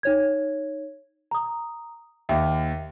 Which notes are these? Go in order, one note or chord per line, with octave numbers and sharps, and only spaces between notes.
D#4 C#5 G#6
A#5 D#6
D#2 E5